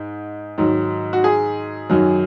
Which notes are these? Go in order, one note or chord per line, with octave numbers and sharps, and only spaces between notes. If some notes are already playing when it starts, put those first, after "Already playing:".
Already playing: G#2
G#2 D#3 F#3
F#4
G#4
F#2 D#3 F#3